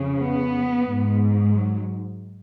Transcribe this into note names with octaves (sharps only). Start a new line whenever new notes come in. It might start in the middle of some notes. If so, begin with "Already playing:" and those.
Already playing: F2 C#3
B3
G#2
F#3